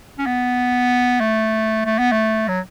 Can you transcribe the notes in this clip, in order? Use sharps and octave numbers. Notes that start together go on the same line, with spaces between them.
C#4
B3
A3
A3
B3
A3
F#3